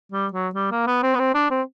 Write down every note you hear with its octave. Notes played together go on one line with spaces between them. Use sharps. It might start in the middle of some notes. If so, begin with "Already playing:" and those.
G3
F#3
G3
A#3
B3
C4
B3
C4
D4
C4